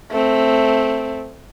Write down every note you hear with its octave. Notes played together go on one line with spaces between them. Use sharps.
A3 C4